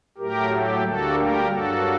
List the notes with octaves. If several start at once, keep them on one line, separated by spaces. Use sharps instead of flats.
A2 F#3 A3 G4 A#4
G4
D2 D3 G3 A#3 F#4 A4
G4 A#4
G2 F#3 A#3 F#4 A4